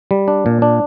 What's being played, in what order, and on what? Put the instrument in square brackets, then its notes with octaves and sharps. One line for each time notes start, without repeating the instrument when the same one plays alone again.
[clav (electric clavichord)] G3
D4
A#2
D4